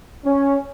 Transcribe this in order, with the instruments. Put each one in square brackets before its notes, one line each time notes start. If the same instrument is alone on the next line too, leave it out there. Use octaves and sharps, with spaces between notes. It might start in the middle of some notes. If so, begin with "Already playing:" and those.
[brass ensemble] C#4